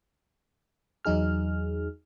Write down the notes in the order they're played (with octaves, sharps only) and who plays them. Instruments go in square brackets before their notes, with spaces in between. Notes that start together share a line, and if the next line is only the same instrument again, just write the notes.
[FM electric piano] E2 F#3 D#4 G#4 F6